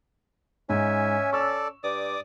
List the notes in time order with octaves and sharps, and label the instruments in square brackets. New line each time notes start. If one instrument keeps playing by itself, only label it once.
[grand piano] G#2 [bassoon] C#4 [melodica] E5 G#5
[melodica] A4 D5 [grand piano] C#6 E6
[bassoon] G2 [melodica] D5 D6 D#6